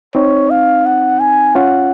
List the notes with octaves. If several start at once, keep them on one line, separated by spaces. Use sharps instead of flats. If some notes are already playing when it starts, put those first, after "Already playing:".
C4 D#4 C#5
F5
F#5
G#5
C#4 F4 F#5